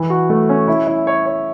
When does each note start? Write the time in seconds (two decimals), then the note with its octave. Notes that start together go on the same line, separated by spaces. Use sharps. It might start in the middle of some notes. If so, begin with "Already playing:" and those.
Already playing: E3
0.10 F#4
0.29 A3
0.49 C#4
0.68 E4
0.87 E4
1.07 C#5
1.26 C#5